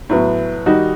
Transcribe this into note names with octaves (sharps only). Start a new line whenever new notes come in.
A2 F#3 B3
D#3 G3 D#4 F#4